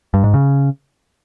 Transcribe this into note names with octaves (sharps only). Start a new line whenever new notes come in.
G2
G#2
C#3